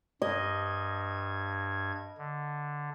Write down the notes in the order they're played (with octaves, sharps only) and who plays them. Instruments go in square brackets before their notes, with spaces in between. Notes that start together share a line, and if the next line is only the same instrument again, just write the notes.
[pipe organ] G2 G#6 [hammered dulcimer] D#5
[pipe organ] D3